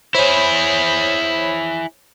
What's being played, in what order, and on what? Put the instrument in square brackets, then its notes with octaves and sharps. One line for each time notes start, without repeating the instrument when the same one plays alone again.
[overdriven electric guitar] E4 G#4 [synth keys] C5 C#5 B5